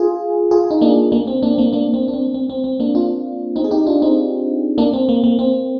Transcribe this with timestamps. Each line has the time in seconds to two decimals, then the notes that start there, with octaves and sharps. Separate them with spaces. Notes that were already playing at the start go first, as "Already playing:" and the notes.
Already playing: F4 G#4
0.51 F4 G#4
0.71 D#4
0.81 A#3 D4
1.12 A#3 D4
1.27 C4
1.43 A#3 D4
1.53 C4
1.58 A#3 D4
1.73 A#3 D4
1.94 C4
2.08 D4
2.14 C4
2.34 C4
2.50 C4
2.64 C4
2.80 A#3 D4
2.95 D4 F4
3.56 C4 D#4
3.64 G#4
3.71 D#4 G4
3.86 D4 F4
4.02 C4 D#4
4.78 A#3 D4
4.94 C4
5.09 A#3
5.24 A#3
5.39 C4